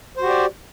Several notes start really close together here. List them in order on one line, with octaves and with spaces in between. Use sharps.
C5 F#4 G4 D5